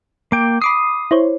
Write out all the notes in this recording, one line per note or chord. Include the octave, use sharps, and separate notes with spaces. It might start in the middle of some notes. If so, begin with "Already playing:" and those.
A#3 G5 D6
B5 D6 D#6 C7
E4 C5 C#5